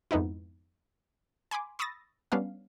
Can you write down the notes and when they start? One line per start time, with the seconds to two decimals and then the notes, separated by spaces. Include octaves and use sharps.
0.11 F2 G#2 B3 D#4 E4
1.51 G#5 B5 C6 D6
1.79 B5 C#6 D#6 E6 A6 A#6
2.32 G3 B3 C#4 D4 F5